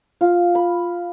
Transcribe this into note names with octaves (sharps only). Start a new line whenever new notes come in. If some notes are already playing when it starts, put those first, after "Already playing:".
F4
B5